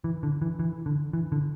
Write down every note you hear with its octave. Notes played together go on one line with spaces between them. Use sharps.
E3
D3
E3
E3
D3
E3
D3